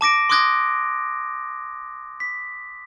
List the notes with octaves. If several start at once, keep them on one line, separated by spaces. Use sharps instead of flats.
A5 D6 A#6 D7
C6 D6 D#6 F#6 G#6 A#6
B6